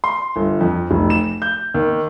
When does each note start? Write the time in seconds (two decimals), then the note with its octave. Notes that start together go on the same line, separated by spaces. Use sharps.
0.04 C6
0.36 G1
0.60 F2
0.91 F1
1.10 E7
1.42 G6
1.74 D#2